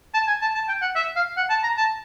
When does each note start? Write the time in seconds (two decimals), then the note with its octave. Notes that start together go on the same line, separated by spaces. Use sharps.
0.14 A5
0.27 G#5
0.41 A5
0.55 A5
0.68 G5
0.81 F#5
0.95 E5
1.16 F5
1.37 F#5
1.49 A5
1.63 A#5
1.77 A5